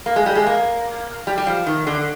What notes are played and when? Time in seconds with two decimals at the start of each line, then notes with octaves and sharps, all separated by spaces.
0.06 A#3
0.16 G#3
0.26 G3
0.35 G#3
0.46 A#3
1.27 G3
1.38 G3
1.47 F3
1.66 D#3
1.87 D3